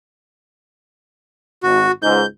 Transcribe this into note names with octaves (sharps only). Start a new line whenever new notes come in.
G#1 F#4
C#2 G#2 G6